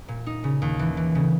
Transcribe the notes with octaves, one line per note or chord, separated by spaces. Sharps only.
A#2
D#4
C#3
D#2
E3
E3
C#3